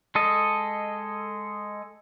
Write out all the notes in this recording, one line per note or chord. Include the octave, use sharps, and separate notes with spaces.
G#3 A4 D#5